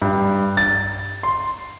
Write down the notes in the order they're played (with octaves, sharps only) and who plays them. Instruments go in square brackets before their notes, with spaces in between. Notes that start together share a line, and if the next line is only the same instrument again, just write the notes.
[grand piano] G2
A6
C6